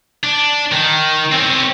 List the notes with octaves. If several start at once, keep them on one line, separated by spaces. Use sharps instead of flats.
D4
D#3
C4 C#4